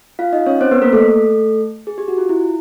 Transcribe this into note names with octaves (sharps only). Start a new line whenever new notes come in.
F4 F5
D#4 D#5
C#4 C#5
C4 C5
B3 B4
A#3 A#4
A3 A4
G#4
G4
F#4
F4
E4